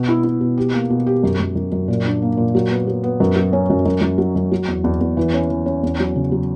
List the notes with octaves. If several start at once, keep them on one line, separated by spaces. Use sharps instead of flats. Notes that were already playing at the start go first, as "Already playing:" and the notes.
Already playing: B2 B3
E4
E4
B2
G4
A#3
B2
G4
F#2
F#2
F#2
F#2
A#2
D4
A#3
A#2
F#3
B3
F#3
B3
F#2
F#3
C#4
F#2
F#2
F#2
F#3
F#2
F#3
E2
E2
E2
E3
C#4
E3
C#4
E2
F#3
C#3
F#3